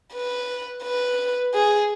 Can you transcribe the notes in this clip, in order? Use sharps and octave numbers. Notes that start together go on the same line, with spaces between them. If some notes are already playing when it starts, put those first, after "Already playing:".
B4
B4
G#4